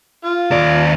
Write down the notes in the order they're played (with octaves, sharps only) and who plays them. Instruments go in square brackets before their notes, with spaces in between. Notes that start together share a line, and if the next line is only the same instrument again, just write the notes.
[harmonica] F4
[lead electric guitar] D#2 D5